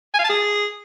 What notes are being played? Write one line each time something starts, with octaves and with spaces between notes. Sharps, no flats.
G#5
F5
A5
G#4